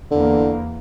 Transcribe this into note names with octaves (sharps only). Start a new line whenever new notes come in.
E2 D3 A#3